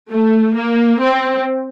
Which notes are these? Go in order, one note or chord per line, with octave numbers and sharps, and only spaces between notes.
A3
A#3
C4